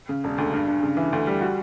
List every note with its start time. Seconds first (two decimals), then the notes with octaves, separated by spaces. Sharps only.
0.09 C#3
0.24 E1
0.38 D2
0.53 G2
0.68 G2
0.83 C#3
0.97 E3
1.13 D2
1.27 G3
1.41 F#4